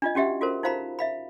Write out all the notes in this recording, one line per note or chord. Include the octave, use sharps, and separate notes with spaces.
D4 F4 D#5
C#4 F#4 G4 E5 F#5
F4 F#4 A4 A#4 C5
D#4 F4 C5 F5 A#5 B5
E5 F5 B5